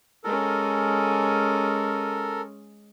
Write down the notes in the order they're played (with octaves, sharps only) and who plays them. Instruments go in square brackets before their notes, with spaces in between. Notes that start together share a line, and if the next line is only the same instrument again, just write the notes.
[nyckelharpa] G#3 C#4 [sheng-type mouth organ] A4 A#4